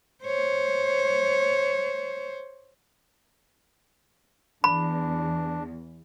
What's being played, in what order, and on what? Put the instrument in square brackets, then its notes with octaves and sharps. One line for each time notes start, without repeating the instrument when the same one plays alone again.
[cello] C5 C#5
[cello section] E2 [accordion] D4 [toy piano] B5